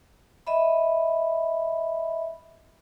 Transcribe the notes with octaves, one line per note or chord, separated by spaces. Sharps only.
D#5 E5 B5